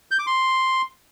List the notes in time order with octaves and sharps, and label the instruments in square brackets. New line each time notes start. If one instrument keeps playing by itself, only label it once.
[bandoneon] G6
D6
C6